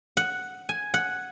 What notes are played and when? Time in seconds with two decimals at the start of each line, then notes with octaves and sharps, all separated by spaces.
0.17 F#5
0.69 G#5
0.94 F#5